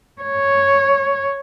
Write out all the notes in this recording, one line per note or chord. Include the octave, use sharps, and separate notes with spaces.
C#5